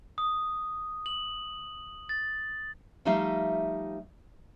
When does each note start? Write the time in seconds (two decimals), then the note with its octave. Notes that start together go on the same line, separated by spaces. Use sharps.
0.18 D#6
1.06 F#7
2.09 A6
3.05 F3 G3 A3 D#4 E5 F5